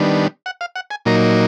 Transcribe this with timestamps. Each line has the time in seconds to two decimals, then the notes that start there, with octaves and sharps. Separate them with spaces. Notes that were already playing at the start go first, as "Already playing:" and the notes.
Already playing: D#3 G3 B3 D4
0.46 F#5
0.61 F5
0.76 F#5
0.91 G#5
1.05 A#2 F#3 A#3 D#4 A#5